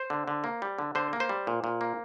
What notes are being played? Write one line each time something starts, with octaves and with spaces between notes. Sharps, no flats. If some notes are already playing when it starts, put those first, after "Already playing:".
Already playing: C5
D3
D3
A#3
G3
D3
D3 C5
A#3
C5
G3
A#2
A#2
A#3